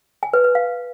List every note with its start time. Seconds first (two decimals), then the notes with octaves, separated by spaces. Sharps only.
0.23 G#5
0.33 B4
0.44 B4
0.55 F5